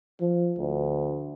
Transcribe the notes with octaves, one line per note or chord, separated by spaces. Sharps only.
F3
D2